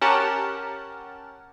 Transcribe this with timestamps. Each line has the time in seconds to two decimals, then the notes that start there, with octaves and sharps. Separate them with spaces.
0.01 C#4 G4 A#4 F#5 A5